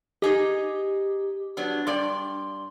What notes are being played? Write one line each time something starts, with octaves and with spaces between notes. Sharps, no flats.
D#4 G4 G#4 D#5
F#3 B3 D4
G2 D5 C6